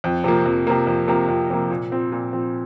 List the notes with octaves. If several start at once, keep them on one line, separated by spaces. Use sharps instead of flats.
F2
C3 F3 A#3
F2
C3 F3 A#3
F2
C3 F3 A#3
F2
C3 F3 A#3
A#2
F3 C4
A#2
F3 C4